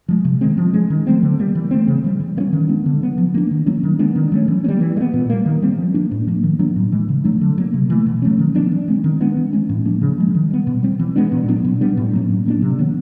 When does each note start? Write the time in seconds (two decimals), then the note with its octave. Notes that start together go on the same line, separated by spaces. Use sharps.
0.08 F3 G#3
0.25 C3
0.41 D#3 G#3 C4
0.57 F3
0.73 G#3 C#4
0.90 D#3
1.07 F#3 A3 C4
1.23 D3
1.39 G3 A#3
1.55 E3
1.71 A3 C4
1.88 C#3
2.04 E3 G3
2.20 E3
2.37 G3 A#3
2.40 C#4
2.53 D#3
2.69 G#3 B3 D4
2.86 D3
3.01 F#3 B3
3.18 F3
3.34 A#3 D4
3.51 D#3
3.66 F#3 A#3 C#4
3.83 D#3
3.99 G#3 B3 D4
4.16 D#3
4.32 F#3 A3 C#4
4.48 E3
4.64 G3 A#3 C#4
4.80 E3
4.97 G#3
5.01 B3
5.13 A#2
5.30 G3 A#3
5.46 D#3
5.62 G3 C4
5.78 F3
5.94 A#3 D4
6.11 A2
6.27 F3 A#3
6.43 D#3
6.59 F#3 B3 D4
6.76 A2
6.92 E3 G#3
7.09 C#3
7.24 F#3 A3 D4
7.41 D3
7.58 F#3 A#3
7.74 C3
7.90 E3 A3
8.06 B2
8.22 F#3 A3 C#4
8.39 D#3
8.55 F#3 B3 D4
8.71 E3
8.88 G#3 C4
9.04 D#3
9.20 G#3 B3 D4
9.37 E3
9.53 G#3 C#4
9.69 A2
9.85 F3 A#3 D4
10.01 C#3
10.18 F3 G#3
10.34 D#3
10.51 G3 B3
10.67 B2
10.83 G3 C4
10.99 E3
11.16 G#3 B3 D4
11.32 A#2
11.48 F#3 B3 D4
11.64 B2
11.81 G3 B3 D4
11.97 A2
12.13 F#3 A#3 C#4
12.29 A2
12.46 F#3 A#3 D4
12.62 C3
12.79 D#3 F#3 B3